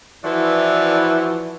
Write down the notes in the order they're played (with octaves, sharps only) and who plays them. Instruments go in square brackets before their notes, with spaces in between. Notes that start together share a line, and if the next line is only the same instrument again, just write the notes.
[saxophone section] E3 F3 E4 F#4 B4 D5